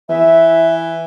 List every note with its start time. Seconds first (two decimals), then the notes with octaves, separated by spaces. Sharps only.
0.09 E3 E5